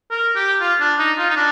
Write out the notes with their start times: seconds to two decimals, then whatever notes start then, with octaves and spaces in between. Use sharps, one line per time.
0.11 A#4
0.36 G4
0.61 F4
0.80 D4
0.99 D#4
1.18 F4
1.30 D#4
1.36 D4